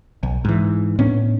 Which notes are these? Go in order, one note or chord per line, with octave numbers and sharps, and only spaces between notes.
B1
G#2 E3
A2 B3 C#4 D4